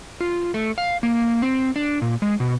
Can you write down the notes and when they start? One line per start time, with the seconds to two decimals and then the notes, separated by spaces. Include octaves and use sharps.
0.21 F4
0.54 A3
0.78 F5
1.03 A#3
1.42 C4
1.76 D4
2.02 A#2
2.22 G#3
2.40 B2